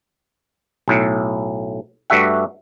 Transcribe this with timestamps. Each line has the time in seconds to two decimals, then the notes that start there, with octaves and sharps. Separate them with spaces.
0.88 B1 A2
2.10 G2 G3 A3 F#4 E5 F#5